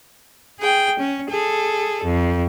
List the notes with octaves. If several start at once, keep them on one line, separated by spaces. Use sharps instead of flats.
G#4 G5
C#4
G#4 A4
F2